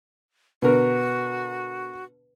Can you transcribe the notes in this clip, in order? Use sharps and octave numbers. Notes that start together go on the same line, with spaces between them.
B2 D3 F#4 A#4 B4